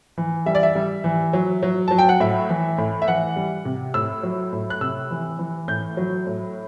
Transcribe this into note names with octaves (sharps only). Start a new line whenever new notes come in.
E3
G3 E5
D5
E5
G3
E3
F#3
F#3
F#3 A5
G5
F#5
A2 E5
E3
A2
E5
E3 F#5
G3
C3
A2 E6
F#3
A2
F#6
C3 E6
E3
E3
A2 G6
F#3
A2